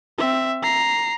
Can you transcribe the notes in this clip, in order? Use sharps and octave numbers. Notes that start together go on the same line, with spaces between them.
C4 E5
A#5 C7